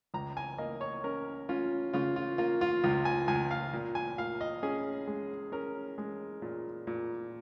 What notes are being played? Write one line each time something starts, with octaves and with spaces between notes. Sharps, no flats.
C#2 A#5
G#5
A#3 D#5
C#5
C#4 A#4
C#4 F4
C#3 F4
F4
A#3 F4
F4
C#2 F4
G#5
C#2 G#5
F5
A#2
G#5
A#2 F5
D#5
C#4 G#4
G#3
C#4 A#4
G#3
A#2
A#2